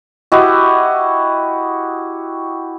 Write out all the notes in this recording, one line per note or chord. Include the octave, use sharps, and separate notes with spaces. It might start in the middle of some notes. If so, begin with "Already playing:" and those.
E4 F#4 G4 D#5